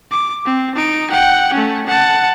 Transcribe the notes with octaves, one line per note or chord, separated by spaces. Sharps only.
D6
C4
D#4 D7
F#5 G5
A3 C#4
F#5 A5